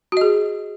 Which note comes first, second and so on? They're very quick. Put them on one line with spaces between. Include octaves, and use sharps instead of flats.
F#4 D#5 G#4